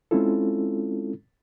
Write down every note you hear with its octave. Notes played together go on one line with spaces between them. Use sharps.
G#3 C4 C#4 E4 F4 A4